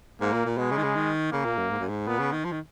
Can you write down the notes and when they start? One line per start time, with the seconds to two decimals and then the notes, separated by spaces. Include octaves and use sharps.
0.21 G#2 A#3
0.33 A#2
0.45 A#2
0.57 B2 G#3
0.71 C#3
0.77 D#3
0.83 C#3
0.95 D#3
1.32 C#3 A#3
1.45 A#2
1.58 F#2
1.70 G#2
1.79 F#2
1.89 G#2
2.07 A#2 B3
2.19 C#3
2.32 D#3
2.45 F3
2.52 D#3